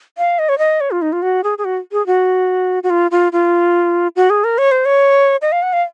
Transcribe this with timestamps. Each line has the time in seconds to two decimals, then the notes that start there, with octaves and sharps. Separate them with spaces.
0.18 F5
0.39 D#5
0.49 C#5
0.58 D#5
0.81 C#5
0.91 F4
1.02 D#4
1.13 F4
1.22 F#4
1.44 G#4
1.58 G#4
1.65 F#4
1.92 G#4
2.07 F#4
2.83 F#4
2.90 F4
3.11 F4
3.32 F4
4.16 F#4
4.30 G#4
4.44 A#4
4.58 C#5
4.71 C5
4.85 C#5
5.42 D#5
5.52 F5
5.62 F#5
5.73 F5